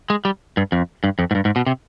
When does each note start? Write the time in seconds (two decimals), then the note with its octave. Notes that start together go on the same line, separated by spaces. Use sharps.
0.10 G#3
0.25 G3
0.57 G2
0.72 F2
1.04 G2
1.19 F2
1.31 G#2
1.35 G2
1.45 G#2
1.56 B2
1.66 C3